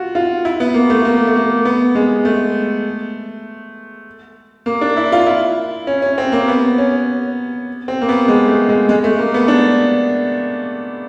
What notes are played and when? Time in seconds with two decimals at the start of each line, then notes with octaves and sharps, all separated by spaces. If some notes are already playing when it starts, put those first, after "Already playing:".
Already playing: F4 F#4
0.15 F4
0.45 E4
0.60 B3
0.74 A#3
0.90 A3
1.05 A#3
1.27 A3
1.36 A#3
1.65 B3
1.95 G#3
2.25 A3
4.66 A#3
4.81 D4
4.97 E4
5.12 F4
5.26 E4
5.87 C#4
6.02 C#4
6.18 C4
6.32 A#3
6.48 B3
6.78 C#4
7.88 C4
8.01 A#3
8.09 B3
8.28 G#3
8.48 A3
8.69 G#3
8.89 G#3
9.04 A3
9.19 A#3
9.34 B3
9.48 D4